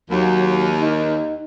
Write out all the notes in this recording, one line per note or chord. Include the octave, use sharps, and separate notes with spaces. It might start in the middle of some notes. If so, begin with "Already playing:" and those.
D#2 F#3
D#4